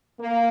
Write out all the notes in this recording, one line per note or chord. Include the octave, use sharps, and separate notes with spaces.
A#3